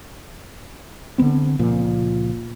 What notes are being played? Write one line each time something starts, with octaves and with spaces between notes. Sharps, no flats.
D3 D#3 B3 C4
C#2 A#2 F3